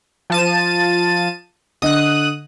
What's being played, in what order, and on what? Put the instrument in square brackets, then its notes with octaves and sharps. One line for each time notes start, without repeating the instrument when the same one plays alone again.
[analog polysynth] F3 A5 D#7
[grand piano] D3 D#5 [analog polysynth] D#6 F#6